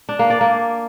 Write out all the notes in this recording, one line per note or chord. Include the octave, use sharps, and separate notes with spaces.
D4
A#3
D5
A#3